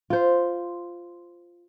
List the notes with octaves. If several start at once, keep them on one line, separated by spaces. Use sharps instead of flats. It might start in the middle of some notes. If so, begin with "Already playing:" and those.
F4 C5